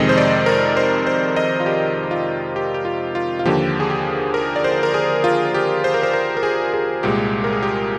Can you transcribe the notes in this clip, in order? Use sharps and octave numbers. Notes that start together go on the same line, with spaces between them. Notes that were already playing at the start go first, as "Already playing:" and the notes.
Already playing: F2 C3 D#3 G#3 D#5
C5
D5
A#4
C5
C5
D#5
F4
G4
F4
G4
G4
F4
F4
F4
D#2 D3 F3 A#3 G4
G#4
G4
A#4
D5
C5
A#4
G#4
F4
G4
C5
A#4
C5
A#4
A#4
G#4
G#4
C2 A#2 G#3 G4
A#4
G#4
G4